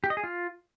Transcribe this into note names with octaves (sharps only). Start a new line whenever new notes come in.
G4
D#5
G#4
F4